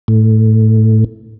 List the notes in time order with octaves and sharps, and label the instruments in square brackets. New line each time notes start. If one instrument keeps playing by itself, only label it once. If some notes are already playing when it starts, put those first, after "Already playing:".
[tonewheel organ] A2